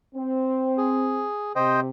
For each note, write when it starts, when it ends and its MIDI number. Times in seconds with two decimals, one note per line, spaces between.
0.15 1.26 60
0.78 1.52 68
1.56 1.90 48
1.56 1.80 72
1.56 1.80 75
1.56 1.80 79